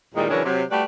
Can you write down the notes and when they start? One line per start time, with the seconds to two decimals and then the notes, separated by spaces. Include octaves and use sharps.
0.15 E2 A#2 D#3 G3 G#3 D#4
0.30 C#3 E3 F#3 C#4 D4 A#4
0.45 C3 F#3
0.71 G3 A3 F#4 G4 B4 D5